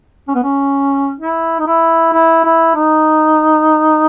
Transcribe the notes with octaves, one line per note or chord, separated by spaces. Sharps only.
C#4
B3
C#4
E4
D#4
E4
E4
E4
D#4